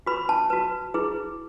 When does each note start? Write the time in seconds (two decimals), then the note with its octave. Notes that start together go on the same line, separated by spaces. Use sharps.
0.06 F#4 B4 B5
0.29 A5
0.50 F#4 B4
0.94 E4 G#4 B4